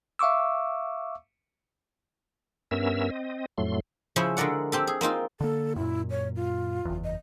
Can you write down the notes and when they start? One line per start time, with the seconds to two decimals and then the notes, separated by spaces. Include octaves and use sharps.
0.19 E5 F5 C#6 D6 E6
2.71 G2 B3 C#4 A#4 E5 E6
3.11 C4 D#5
3.58 F2 A2 F#3 A3 C6
4.16 C#3 F3 C#4 E4 C5
4.37 D3 G#3 A#4 D5 F#5
4.72 C4 G4 A4
4.87 G#4
5.01 A#3 C4 D#4 F4
5.41 D3 A#3 A4
5.76 F#2 A#2 E4
6.10 C#5
6.36 F4
6.85 F#1 E2
7.04 D#5